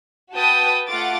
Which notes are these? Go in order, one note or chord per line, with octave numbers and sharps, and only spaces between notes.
F#4 B4 G5 A5 D#6
A3 F4 F#5 D6 A6